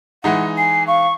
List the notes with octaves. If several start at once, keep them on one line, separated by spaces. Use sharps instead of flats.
E3 G#3 D#4 F#5
G#5 C7
F5 C#6